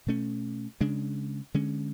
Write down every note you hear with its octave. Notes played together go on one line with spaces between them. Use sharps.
B2 A3 C#4
C#3 G#3 D4
D3 G#3 C#4